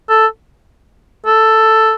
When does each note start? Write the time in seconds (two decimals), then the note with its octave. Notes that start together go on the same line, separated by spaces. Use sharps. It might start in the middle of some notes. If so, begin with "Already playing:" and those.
0.09 A4
1.26 A4